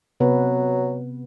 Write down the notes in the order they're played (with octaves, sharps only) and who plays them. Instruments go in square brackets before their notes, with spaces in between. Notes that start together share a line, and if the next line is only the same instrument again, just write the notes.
[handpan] C3 B3 B4 [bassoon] F#3